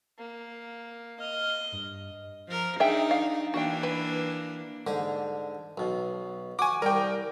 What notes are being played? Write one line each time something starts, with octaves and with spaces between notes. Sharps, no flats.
A#3
D#5 F6
G2
F3 A#4
D4 D#4 G#4 E5 G5
F5
E3 A#3 D4 F#4 G5
B4
G#2 D3 G4
B1 B2
F#4 G#5 C#6 D6
C2 G3 A#4 G5